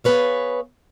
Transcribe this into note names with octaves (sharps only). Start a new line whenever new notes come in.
B3 G#4 A4 B4 C#5 F5